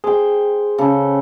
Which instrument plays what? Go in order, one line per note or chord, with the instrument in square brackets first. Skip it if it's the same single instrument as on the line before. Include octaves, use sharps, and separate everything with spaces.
[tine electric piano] G#4 [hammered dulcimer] C5 G5
[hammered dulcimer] C#3 A4